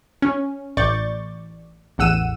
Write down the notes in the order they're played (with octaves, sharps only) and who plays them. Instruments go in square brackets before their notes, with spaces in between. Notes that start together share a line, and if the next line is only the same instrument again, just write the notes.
[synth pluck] C#4
A1 D5 C#6 G6 A6
A1 E2 F#5 E6 D#7 E7